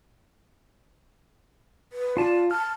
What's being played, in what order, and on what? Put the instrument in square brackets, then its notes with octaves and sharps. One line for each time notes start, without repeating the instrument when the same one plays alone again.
[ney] B4
[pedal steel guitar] F4 A5 [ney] D5
[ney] A5 [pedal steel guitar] F6